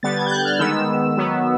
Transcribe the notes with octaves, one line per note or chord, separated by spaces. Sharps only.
D3 G3 B3 A6
G#6
G6
F#6
F6
D#3 G#3 B3 E6
D#3 F#3 B3